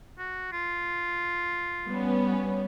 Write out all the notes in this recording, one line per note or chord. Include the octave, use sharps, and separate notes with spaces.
F#4
F4
G3 B3 C#4